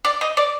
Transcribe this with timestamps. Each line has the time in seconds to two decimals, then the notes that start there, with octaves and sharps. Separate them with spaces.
0.05 D5
0.21 D#5
0.37 D5